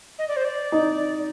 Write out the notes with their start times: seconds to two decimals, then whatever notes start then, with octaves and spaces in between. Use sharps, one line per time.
0.19 D#5
0.28 D5
0.36 C5
0.45 D5
0.72 D#4